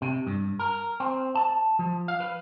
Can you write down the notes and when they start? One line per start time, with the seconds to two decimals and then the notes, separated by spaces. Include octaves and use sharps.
0.02 C3
0.27 G2
0.59 A#4
1.00 C4
1.35 A5
1.79 F3
2.08 F5
2.20 B4